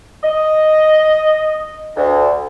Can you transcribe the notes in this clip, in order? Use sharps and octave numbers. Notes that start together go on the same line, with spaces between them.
D#5
D2